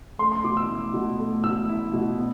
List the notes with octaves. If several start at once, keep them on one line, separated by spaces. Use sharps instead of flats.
A3 C6
C6
B2 D6
E6
E4
B2
A3
B2 E6
E4
B2
B3